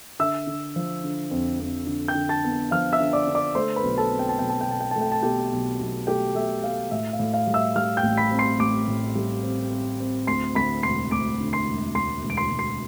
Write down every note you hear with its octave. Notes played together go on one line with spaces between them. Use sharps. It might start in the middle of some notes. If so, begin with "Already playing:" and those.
D3 E5 E6
D3
F3
D3
F2
F2
D3
G5 G6
D3
A5 A6
B3
F3 F5 F6
E5 E6
D3
D5 D6
D3
D5 D6
A3 C5 C6
B4 B5
B1
A4 A5
C4
G5
A5
B1 G5
A5
G5
B2 A5
G5
A3 A5
G5
A5
B2 G4 G5
B1
B1
A3 G4 G5
A3 E5
A3 F5
A2 E5
F5
A2
F5
G3
E5 E6
G3 F5 F6
G5 G6
A1
B5 B6
C4
C6 C7
A1 D6 D7
A2
G3
C4
C4
C4
D2 C6 C7
D2 B5 B6
E1 C6 C7
D2 D6 D7
D3
C6 C7
E1
D2 C6 C7
E1
D7
C6 C7
E1
C6 C7